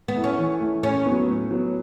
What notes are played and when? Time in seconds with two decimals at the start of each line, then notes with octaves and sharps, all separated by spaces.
0.08 B3
0.16 A3 E4
0.24 C#4
0.38 E3
0.61 A3 E4
0.83 A2 C#4
1.06 F#3 B3
1.29 A2
1.51 F#3 B3